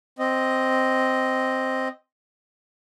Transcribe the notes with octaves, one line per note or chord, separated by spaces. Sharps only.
C4 D#5